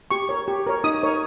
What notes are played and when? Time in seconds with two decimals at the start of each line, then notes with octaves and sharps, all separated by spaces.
0.11 G4 C#6
0.29 A#4 C#5
0.48 G4
0.66 A#4 C#5
0.84 D#4 D#6
1.03 A#4 C#5